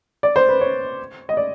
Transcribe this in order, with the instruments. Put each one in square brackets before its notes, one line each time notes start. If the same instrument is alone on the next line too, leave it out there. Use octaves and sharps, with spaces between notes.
[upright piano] D5
C5
B4
C#5
D#5
D5